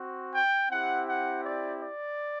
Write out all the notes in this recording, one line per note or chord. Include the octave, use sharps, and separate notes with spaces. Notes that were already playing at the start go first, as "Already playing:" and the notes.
Already playing: C4 F#4
G5
C4 E4 G4 F#5
F#5
D5
D5